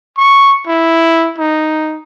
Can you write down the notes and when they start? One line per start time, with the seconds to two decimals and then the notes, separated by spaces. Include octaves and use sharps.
0.17 C#6
0.67 E4
1.38 D#4